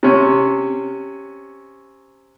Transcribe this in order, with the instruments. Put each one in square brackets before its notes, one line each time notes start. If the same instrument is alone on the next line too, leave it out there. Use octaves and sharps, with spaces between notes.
[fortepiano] C3 C#4